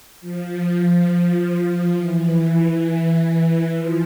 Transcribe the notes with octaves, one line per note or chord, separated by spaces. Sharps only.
F3
E3
F3